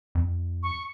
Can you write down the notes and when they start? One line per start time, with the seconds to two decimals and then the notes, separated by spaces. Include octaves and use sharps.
0.15 F2
0.63 C#6